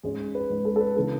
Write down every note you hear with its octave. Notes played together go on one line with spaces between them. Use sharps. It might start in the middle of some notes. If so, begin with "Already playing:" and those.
G#2 G#3 C#4 G#4
B4
G#2 G#3 C#4
A4
A4
B4
C#3 E3 B3 D4 A4